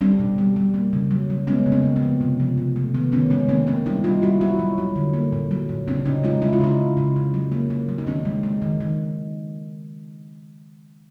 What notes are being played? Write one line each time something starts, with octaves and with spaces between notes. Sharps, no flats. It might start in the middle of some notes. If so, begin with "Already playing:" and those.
G3 C4 D4
B2
G3
G3
A#3
C#3
F#3
F#3
G#3 B3 C#4
C#3
A#3 C4
C#3
B3
F3
C3
F3
C3
A3
D#3 B3
D#3 B3 C#4
G#3 B3 C#4
D#3 A#3 C4
A#3 C4
G3 D4 E4
G3 D#4 F4
G3 E4 F#4
F#3 E4 F#4
F#3
F#3
D3
A#3
A#2
F#3
A#2
C#3 C4 D4
C#3 C#4 D#4
G#3 D#4 F4
G#3 E4
F4
C#3 D4 E4
C#3
C#3
C#3
F#3
A#3
A#3
F#3
D#4
D#3 C4 D4
G#3
G#3
D#3
D#3